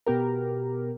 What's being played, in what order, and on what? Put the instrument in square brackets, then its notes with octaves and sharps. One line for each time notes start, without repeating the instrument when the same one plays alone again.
[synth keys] B2 B3 G4 A#4